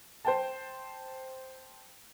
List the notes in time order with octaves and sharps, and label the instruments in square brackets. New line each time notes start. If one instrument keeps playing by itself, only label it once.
[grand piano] C5 G5 A5